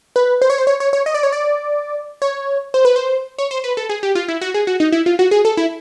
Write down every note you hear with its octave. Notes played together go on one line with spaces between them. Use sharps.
B4
C5
C#5
C5
C#5
C#5
C#5
D#5
D5
C#5
D5
C#5
C5
B4
C5
C#5
C5
B4
A4
G#4
G4
F4
E4
F#4
G#4
F#4
D#4
E4
F4
F#4
G#4
A4
E4